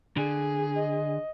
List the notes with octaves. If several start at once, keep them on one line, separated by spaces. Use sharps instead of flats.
D3 G#4
D#5